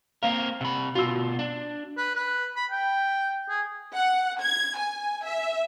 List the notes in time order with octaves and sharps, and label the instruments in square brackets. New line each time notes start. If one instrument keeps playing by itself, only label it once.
[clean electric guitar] A#3 C4 A#4 [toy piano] F5
[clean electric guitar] C3 B5 [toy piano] F#5
[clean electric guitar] B2 F4 [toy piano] F#4 E6
[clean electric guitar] D4
[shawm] B4
B4
B5
G5
G#4
[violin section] F#5
G#6
G#5
E5